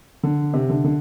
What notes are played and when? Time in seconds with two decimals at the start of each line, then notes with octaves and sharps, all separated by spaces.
0.23 D3
0.54 C3
0.70 D3
0.84 D3